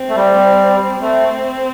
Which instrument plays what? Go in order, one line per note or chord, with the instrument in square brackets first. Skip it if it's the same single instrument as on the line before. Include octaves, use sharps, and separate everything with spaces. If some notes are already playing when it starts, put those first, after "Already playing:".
Already playing: [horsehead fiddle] C4
[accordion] A3
G3
[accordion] A3 [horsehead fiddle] C4